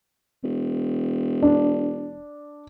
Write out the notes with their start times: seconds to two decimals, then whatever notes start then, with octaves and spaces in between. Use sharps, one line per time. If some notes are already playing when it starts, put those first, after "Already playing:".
0.44 E1
1.43 D4